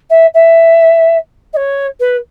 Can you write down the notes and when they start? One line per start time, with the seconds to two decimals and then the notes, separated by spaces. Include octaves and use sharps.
0.10 E5
0.34 E5
1.53 D#5
1.56 C#5
2.00 B4